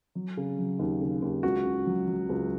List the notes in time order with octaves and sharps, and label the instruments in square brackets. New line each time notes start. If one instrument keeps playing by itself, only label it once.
[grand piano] F#3
C#3
F#3
D#2
C#3
D#2
C#2 F#4
C#3
F#3
F#3
C#2